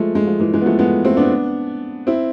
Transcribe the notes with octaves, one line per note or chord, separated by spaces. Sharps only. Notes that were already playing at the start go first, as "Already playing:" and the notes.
Already playing: F3 G#3 A3
G#3
F3
E3 G#3
E3 G#3
B3
F3 A3
G#3 B3
A3 C4
B3 D4
C4 E4